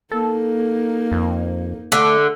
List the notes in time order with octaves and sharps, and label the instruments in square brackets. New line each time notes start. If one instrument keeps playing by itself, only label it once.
[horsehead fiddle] A#3 D#4 [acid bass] A4
[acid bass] F2
[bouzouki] D3 [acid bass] A3